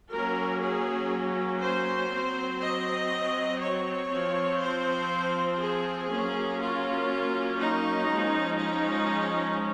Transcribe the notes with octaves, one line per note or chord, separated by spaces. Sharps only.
F#3 A#3 C#4 A#4
G#4
C5
F#3 C4
D#5
C#5
F3 C4
C5
G#4
F#3 A#3 C#4
F4
D#4
F3 G#3 C#4
D#4